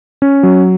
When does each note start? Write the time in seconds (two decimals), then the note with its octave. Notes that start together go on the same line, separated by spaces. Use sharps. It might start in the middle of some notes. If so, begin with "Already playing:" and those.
0.22 C#4
0.43 F#3